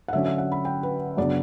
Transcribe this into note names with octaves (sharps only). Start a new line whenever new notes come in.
F#5
D3 F#3 C#4 E5
E5
F#5
B5
G5
B4
F#2 C#3 F#3 B3 D4 D5